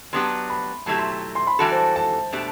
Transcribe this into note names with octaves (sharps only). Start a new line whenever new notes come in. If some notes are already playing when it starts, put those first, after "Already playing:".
F#3 B3 D4 G4 C6
B5
B2 F#3 A3 E4 G4 A5
C6
C6
B5
E3 G3 D4 F#4 A4
C5
A5
B2 A3 D4 G4